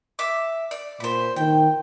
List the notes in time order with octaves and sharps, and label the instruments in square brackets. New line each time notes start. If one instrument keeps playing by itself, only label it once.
[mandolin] E5 D6
D5
[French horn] A#2 [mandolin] C5 B5
[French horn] D#3 [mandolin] G5